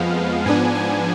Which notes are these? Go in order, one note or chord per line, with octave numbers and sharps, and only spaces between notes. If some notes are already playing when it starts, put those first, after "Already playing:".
Already playing: F2 F3 G#3 B3 F5
G#2 F3 B3 D4 G#5
G#5